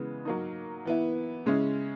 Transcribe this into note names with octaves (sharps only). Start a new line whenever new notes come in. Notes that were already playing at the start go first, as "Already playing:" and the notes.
Already playing: C#3 E3 G#3 B3
F#3 A#3 D#4
E3 B3 E4
C#3 G#3 C#4 E4